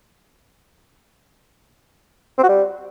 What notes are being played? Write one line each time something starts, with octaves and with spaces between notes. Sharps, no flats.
C4
F#4
G3